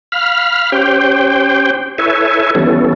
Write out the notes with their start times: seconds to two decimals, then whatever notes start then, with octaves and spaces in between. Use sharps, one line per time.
0.12 F5 B5 F6
0.72 C#4 G4 C5 G5
1.98 E4 A4 B4 C#5 E5 G#5
2.55 E3 G3 B3 C#4 A4